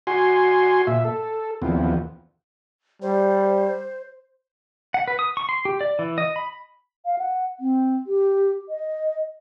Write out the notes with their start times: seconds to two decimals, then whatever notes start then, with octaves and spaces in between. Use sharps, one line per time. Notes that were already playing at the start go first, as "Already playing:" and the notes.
0.07 F#4 G#5 C6
0.87 A#2 E5
1.05 A4
1.62 D#2 E3 F3 B3 C4
3.02 G3 C5
4.94 F#5
5.08 B4
5.19 D#6
5.37 C#6
5.49 C6
5.65 G4
5.81 D5
5.99 E3
6.18 D#5
6.36 B5
7.05 F5
7.18 F#5
7.60 C4
8.07 G4
8.69 D#5